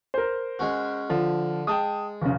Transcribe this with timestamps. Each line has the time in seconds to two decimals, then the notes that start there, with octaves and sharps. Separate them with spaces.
0.14 A#4 C5
0.59 G#3 C#4 F#4
1.10 D3 F3
1.67 G#3 G5 A5 D#6
2.22 F1 C#3